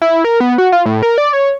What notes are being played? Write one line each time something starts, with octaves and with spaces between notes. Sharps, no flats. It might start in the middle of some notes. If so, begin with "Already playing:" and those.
E4
A#4
B3
F#4
F4
A2
A#4
D5
C#5